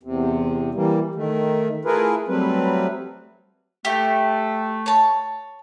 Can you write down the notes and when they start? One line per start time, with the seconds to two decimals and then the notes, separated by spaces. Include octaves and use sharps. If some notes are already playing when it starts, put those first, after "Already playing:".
0.03 E2 C3
0.75 E3 G3 A#3
1.15 D#3 A3
1.85 A3 E4 F4 G#4 A#4 B4
2.28 F#3 G3 A3 C4 B4
3.85 A3 G4
4.86 C#5 A5